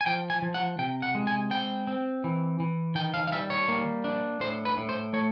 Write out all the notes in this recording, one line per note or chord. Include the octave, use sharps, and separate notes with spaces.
G#5
F3 G5
G#5
F3
F#5
C3 G5
F#5
G#3
G#5
C4 G5
C4
E3
E3
D#3 G5
F5
F5
G3 E5
C#5
A#3
D4
A2 C5
B4
A2
C5
A3 C#5